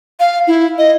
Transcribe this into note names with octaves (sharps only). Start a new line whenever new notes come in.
F5
E4
D#5